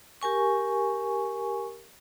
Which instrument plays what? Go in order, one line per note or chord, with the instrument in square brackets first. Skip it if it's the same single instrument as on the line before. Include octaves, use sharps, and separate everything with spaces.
[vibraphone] G4 A#4 G#5 C#6